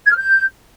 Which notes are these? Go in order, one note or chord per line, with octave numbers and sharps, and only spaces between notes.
G#6
F6
G6